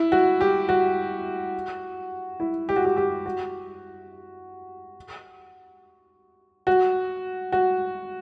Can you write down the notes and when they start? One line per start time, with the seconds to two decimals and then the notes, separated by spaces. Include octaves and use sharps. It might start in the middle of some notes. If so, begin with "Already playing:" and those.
Already playing: E4
0.12 F#4
0.41 G4
0.69 F#4
2.40 E4
2.69 G4
2.76 F#4
2.85 G4
2.97 G4
3.26 F#4
6.67 F#4
7.52 F#4